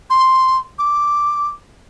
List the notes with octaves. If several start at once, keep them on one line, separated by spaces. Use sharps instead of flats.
C6
D6